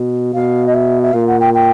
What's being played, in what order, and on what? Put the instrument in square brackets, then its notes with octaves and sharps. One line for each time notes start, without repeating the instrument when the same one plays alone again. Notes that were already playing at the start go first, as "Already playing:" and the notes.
Already playing: [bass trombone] B2
[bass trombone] B2 [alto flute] F5
[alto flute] D#5
E5
E5
[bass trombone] A#2 [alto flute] F5
[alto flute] F#5
G5
G5